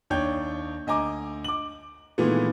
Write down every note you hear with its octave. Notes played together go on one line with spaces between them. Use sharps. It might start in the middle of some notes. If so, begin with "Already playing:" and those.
D#2 D4 D#4 C#5 G5 G6
D2 D#5 G#5 A#5 D6
D6 F#7
A#2 D#3 E3 G#3 A3 B3